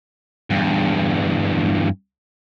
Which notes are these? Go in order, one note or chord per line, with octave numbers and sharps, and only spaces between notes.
E2 G2